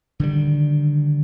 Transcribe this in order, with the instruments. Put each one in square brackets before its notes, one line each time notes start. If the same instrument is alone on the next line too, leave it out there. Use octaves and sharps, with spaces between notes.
[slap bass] D3 D#3 G3